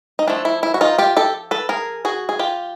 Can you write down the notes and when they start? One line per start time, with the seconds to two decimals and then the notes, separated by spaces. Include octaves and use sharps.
0.19 D#4
0.28 F3 A3 D4 E4
0.45 E4
0.63 E4
0.74 F#4
0.81 D#4 F4
0.98 F4 G4
1.17 G4 A4
1.51 A4 B4
1.69 G#4 A#4
2.05 F#4 G#4
2.29 G#4
2.39 F4 G4